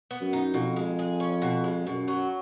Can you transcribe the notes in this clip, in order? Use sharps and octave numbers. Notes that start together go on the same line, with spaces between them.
B3
F#2
D#4
F2 B2
G#3
G#4
C#4
B2
G#3
F#2 B2
F#3